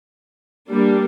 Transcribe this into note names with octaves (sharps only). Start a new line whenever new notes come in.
G3 A#3 D4